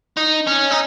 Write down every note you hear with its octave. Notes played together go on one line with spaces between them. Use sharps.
D#4
C#4
D#4